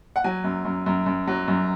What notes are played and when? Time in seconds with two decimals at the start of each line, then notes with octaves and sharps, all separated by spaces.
0.16 F#5
0.24 F#3 G#5
0.44 F#2
0.65 F#2
0.86 F#2
1.06 F#2
1.27 F#3
1.48 F#2